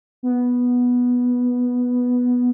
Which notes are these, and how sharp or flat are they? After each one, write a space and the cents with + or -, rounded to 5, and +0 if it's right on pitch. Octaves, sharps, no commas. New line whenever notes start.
B3 -5